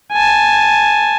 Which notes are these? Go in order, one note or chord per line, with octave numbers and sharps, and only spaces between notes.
G#5 A5